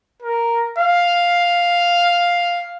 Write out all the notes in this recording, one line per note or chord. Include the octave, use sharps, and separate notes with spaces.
A#4
F5